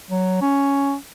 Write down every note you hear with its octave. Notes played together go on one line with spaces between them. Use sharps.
F#3
C#4